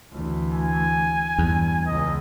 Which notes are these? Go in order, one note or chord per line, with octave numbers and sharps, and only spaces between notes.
D2 E3
G#5
E2 G2
C#2 D#5